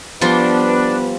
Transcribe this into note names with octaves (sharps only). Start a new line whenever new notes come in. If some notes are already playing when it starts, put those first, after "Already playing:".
F3 G3 B3 D4 F4 B4